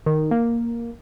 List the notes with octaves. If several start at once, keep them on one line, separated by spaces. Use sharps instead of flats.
D#3
A#3